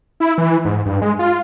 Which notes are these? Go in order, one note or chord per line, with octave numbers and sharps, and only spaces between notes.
E4
E3
G#2
G2
G#3
F4